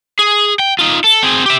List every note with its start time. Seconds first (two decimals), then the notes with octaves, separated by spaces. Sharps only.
0.19 G#4
0.59 G5
0.79 D#4 F4
1.04 A4
1.23 C4 G#4
1.46 G4 E5